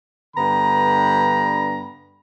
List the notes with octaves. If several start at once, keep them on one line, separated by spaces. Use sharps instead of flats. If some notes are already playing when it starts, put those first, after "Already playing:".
G2 D3 B3 A#5 B5